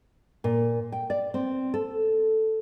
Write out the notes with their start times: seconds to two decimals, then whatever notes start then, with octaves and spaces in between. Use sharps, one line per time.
0.44 A#2
0.92 G5
1.10 D5
1.34 C4
1.74 A4